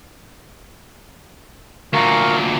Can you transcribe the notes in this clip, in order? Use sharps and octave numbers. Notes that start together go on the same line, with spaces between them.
D2 A#2 A#4 F5 C#6